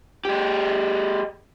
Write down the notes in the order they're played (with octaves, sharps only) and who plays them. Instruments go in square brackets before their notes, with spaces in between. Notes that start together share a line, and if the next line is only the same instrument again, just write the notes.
[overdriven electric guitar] G#3 G4